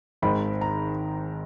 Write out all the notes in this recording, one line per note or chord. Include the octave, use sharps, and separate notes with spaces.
G#1 G#2 D#3 G#3 B5
A#5